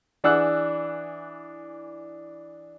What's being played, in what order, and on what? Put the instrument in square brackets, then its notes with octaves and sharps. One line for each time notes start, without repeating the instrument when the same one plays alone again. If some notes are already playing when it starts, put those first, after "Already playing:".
[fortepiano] E3 D4 G#4 F#5 E6 F#6